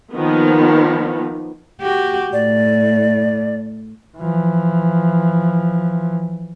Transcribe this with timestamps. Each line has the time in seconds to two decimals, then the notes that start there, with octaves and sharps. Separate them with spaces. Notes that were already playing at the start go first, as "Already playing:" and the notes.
0.14 D#3 F3 A#3 B3
1.81 F#4 G4
2.33 A2 D5
4.18 E3 F3